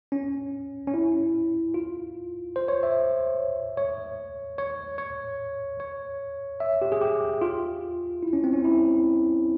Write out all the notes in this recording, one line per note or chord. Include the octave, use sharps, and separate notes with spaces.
C#4
C#4
E4
F4
C5
C#5
E5
C#5
C#5
C#5
C#5
E5
G4
G#4
G4
F4
E4
C#4
C4
C#4
E4